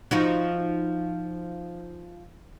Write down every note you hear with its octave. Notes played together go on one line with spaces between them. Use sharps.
F3 D#4 F#4